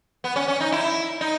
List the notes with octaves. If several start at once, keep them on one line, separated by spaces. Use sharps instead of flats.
B3
C#4
C#4
D#4
E4
D#4